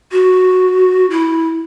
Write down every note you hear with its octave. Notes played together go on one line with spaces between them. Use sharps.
F#4
E4